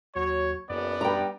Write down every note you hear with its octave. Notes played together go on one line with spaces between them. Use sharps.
D#2 F#3 C#5
F#1 F#2 B3 D5
G2 G5 A#5